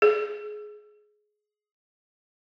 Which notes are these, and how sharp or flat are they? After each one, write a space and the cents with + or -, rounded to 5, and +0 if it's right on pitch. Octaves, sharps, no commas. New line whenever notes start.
G#4 +20